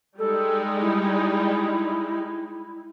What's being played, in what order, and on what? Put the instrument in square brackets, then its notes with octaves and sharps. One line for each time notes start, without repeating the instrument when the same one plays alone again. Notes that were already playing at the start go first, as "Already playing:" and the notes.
[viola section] G3 G#3 D#4 [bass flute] A4
[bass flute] E4